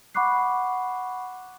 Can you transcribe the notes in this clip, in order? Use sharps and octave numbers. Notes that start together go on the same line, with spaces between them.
F#5 B5 C#6 D6 F#6 C7